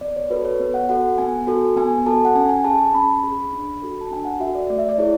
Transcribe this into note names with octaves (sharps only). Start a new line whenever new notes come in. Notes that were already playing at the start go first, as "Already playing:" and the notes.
B3 D5
C#5
F#4 A4 B4
C#5
B3
F#5
F#4 A4 F#5
B3 G#5
F#4 A4
B3 G#5
F#4 A4 A5
F#5
C#4 G#5
G#5
G#4 A5
A5
C#4 B5
G#4
D4
F#4 A4
A5
D4 G#5
F#5
F#4 A4 E5
D5
A3 D5
E5
D5
E4 G#4 C#5